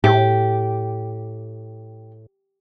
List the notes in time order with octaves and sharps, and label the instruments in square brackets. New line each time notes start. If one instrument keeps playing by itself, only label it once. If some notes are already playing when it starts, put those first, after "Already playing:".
[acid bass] A2 [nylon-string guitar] G4